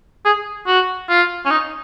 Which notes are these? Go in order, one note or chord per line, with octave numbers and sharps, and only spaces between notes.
G#4
F#4
F4
C#4
D#4